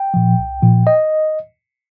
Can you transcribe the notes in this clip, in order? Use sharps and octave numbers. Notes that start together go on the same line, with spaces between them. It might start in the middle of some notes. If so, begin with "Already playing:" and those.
Already playing: G5
A#2 F3
C2
A#2 F3
D#5